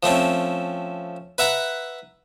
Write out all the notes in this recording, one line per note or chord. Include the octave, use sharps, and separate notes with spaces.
F3 A3 C4 C#4
B4 E5 F#5 A#5